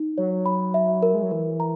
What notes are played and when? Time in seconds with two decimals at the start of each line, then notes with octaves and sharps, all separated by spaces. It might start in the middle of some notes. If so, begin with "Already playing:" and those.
Already playing: D#4
0.18 F#3 C#5
0.46 B5
0.74 E5
1.03 A#4
1.14 G#3
1.23 F#3
1.31 E3 A#4
1.60 A#5